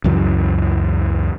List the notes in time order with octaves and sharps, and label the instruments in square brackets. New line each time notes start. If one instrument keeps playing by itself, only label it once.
[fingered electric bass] C#2 F#2 E3